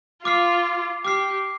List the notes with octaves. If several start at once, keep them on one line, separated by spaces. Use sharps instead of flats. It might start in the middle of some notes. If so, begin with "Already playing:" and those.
F4 D6 F6 C7
G4 D6 F6 C7